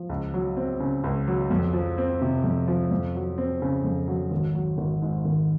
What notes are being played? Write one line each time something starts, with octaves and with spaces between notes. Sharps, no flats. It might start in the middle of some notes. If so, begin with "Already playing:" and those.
Already playing: F3
C#2
F#3
C4
C#3
C#2
F#3
F2
F3
C4
C3
F2
F3
F2
F#3
C4
C#3
F2
F#3
G#1
F#3
G#1
G#2
G#1